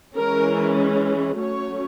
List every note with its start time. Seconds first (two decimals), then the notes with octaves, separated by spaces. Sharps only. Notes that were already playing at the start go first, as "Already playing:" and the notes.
0.16 E3 G#3 C#4 A#4
1.39 F#3 A3 C#4 C#5